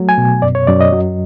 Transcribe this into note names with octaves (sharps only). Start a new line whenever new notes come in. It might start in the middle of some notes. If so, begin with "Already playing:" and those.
Already playing: F#3 A3
G#5
B2
F#2 D5
C#5
F#2 D5
D#5
F#3